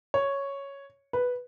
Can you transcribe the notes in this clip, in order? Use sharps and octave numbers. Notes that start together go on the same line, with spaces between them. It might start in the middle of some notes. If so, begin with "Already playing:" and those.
C#5
B4